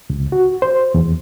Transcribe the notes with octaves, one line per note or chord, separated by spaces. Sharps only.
C#2
F#4
C5
E2